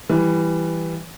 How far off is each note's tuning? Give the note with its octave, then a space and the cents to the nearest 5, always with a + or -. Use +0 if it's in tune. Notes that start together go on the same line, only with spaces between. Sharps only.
E3 +5 G3 +0